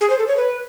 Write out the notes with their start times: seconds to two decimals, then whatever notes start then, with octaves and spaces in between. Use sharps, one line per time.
0.01 G#4
0.10 C5
0.19 A4
0.28 C#5
0.37 B4